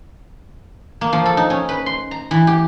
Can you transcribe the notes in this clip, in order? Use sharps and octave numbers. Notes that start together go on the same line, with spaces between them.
A#3
F3
A4
D#4
C#4
B4
C6
A#5
E3
G4